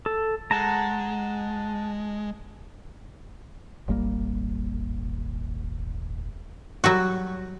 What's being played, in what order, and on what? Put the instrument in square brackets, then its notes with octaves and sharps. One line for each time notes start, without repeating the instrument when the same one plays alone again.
[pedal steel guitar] A4
[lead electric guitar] G#3 [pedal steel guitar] F#5 A5 A#5
[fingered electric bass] D#1 G#1 G3 A#3
[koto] F#3 G3 F#4